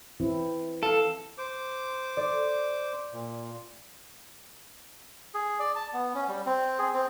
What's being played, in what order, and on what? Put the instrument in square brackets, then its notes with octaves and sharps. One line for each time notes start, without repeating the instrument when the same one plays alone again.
[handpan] E3 C4 E4
[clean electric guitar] A4 [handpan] F5
[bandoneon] C5 D6
[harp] D5
[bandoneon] A#2
[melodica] G#4
D5
A5
B3
C#4
G3
C4
G#4
C4